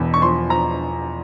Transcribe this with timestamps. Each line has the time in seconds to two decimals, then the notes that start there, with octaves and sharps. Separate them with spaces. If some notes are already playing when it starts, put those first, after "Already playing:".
Already playing: E1 E2
0.14 C#6
0.21 F3 C6
0.49 F3 A#5